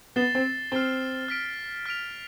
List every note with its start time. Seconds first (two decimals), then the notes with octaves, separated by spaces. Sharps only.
0.16 B3 A6 C7 E7 G7
0.35 C4
0.72 C4 F6 C7 G7
1.28 F6 B6 D7
1.86 F6 B6 D7 F7